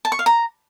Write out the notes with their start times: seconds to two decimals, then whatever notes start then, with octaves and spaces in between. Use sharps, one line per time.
0.05 A5
0.12 C#6
0.19 F5
0.26 A#5